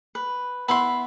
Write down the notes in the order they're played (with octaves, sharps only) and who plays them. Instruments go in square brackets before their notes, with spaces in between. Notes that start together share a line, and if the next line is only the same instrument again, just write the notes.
[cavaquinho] B4
[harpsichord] B3 E4 [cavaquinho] B5 C6